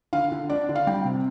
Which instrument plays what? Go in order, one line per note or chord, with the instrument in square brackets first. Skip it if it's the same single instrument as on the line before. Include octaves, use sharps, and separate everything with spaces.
[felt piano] D3 F5
D3
D4 D5
D3
F5
G3 G5
C3